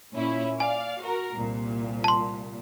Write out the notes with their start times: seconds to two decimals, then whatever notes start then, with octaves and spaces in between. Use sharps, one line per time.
0.13 A#2 C#4 E4
0.60 D5 F5 G#5
1.01 F#4 A#4
1.34 C2 A#2
2.04 A5 C6